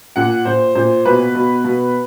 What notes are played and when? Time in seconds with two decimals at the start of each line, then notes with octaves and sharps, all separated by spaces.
0.16 A#2 F#5
0.45 A#2 C5
0.75 A#2 C5
1.05 B2 B4
1.35 B2
1.64 B2